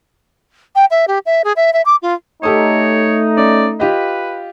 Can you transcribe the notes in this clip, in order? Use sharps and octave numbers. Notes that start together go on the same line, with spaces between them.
G5
E5
G4
E5
G#4
E5
E5
D6
F4
A3 D#4 G4 A4 C#5 D#6
C#4 D5
F4 G4 B4 D#5